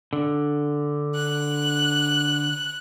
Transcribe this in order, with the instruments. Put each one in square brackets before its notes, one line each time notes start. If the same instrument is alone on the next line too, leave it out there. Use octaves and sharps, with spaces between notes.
[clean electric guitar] D3
[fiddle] F#6